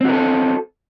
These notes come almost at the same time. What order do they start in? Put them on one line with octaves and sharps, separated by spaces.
C4 F#4 A#4 A4